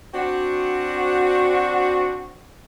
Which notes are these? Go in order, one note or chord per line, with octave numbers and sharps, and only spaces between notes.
C4 D4 F#4